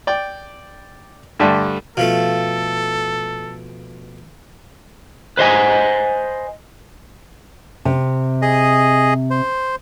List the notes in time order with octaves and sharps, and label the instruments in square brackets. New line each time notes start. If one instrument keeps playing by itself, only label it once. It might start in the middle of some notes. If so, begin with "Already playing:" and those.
[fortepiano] D5 G5
G2 D3 G3 A3
[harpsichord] B2 F3 A3 [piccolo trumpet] A4 [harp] F5
[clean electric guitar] B4 C5 D#5 G#5
[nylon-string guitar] C3
[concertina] G#4 D#5
C5